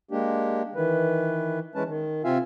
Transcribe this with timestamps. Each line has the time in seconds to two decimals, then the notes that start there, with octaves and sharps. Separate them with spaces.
0.11 G#3 A#3 D4 G4
0.75 D#3 E3 B4
1.75 E3 G#3 C#4 B4 A5
1.88 D#3
2.24 C3 C4 F4 E5 F5 G#5